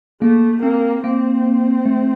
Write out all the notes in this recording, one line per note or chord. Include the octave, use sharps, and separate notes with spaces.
A3 A#3
A#3 C4
A#3 C4
A3